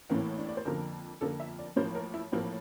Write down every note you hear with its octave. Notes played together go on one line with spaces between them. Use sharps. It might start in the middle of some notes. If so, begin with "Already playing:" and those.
A1 A2 E3 A#3 C4
D4
D5
C5
F2 D3 F3 A#3 A#4
F2 D3 F3 A#3 A4
E5
D5
A1 A2 F3 A#3 C5
A#4
E4
A1 A2 F3 A#3 C4